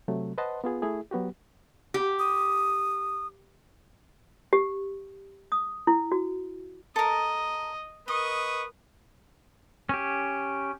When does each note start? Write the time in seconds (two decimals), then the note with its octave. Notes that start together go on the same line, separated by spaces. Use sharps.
0.08 C3 F#3 A3
0.38 B4 C5 D#5 F#5 A5 C6
0.64 B3 F4 G#4
0.82 A3 E4 G#4
1.11 F#3 B3 F#4 G4
1.94 G4
2.19 D#6
4.53 G4
5.52 D#6
5.87 E4
6.12 F#4
6.96 A4 A#4 D#5
8.08 A#4 B4 D#5 C#6 D#6
9.89 C#4 G4